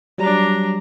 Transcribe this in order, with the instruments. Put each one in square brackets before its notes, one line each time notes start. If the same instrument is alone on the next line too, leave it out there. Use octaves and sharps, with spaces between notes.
[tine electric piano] F#3 G3 [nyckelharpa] D4 A#5